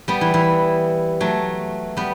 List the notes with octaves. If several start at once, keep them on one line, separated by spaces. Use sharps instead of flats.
G3 B3
E3
E3
F#3 A3
G3 B3